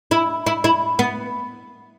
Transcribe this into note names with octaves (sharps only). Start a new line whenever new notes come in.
E4
E4
E4
B3